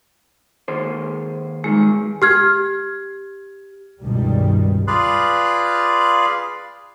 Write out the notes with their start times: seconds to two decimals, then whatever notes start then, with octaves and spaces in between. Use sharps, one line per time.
0.68 D#2 G#4 C5
1.64 G2 D#3 G#3 G#4
2.22 G4 F6 G#6
4.03 C#2 G2 B2 D#3 G3
4.87 F4 G#4 B4 D5 F5 F#6